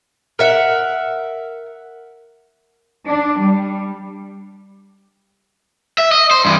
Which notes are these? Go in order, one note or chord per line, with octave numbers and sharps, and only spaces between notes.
A#4 E5 F#5
D4
G3
E5
D#5
C5
G2 E3